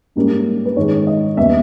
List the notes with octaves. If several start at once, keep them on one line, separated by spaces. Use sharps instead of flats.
G#2 G3 A#3 C#4
B4
G#2 D#3 G#3 C#5
D#5
D#2 C#3 G3 B3 E5